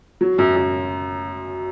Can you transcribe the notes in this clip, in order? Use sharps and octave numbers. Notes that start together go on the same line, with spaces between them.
F#3
F#2
F#2